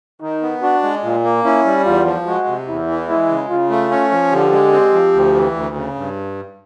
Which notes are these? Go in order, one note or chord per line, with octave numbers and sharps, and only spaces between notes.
D#3 D#4
B3
D4 F#4
G#3
A#2 F4
A#3
C#4 E4
G3
E2 F4
F3
G#3 F#4
C3
E2 E4
E3
G#3 E4
C#3
C#3 F4
A3
C#4
F3
D3 G4
G#3
C4
F3
D2
E3
D2
C#3
G2